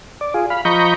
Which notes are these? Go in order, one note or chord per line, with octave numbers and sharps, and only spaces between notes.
D5
F4 G#4
F5 B5
F3 D#5 A#5 B5 C#6 G6